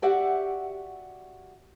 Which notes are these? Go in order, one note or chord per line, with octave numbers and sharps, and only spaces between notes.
F#4 G4 D5 E5 F#5